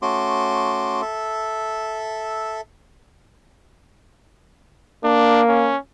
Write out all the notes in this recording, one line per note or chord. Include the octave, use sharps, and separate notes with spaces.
A3 C#4 F#4 C6 D6
A4 E5
A#3 D4
C#4